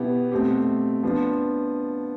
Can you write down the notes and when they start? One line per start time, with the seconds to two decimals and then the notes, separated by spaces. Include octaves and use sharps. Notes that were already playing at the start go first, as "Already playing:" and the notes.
Already playing: B2 B3 E4 G4
0.31 B2 A3 C4 G4
1.03 F3 B3 D4